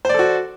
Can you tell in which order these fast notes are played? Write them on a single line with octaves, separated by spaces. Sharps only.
C5 D5 A4 F#4